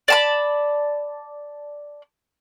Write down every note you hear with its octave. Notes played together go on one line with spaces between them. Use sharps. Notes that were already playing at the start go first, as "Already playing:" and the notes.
D5 A5 B5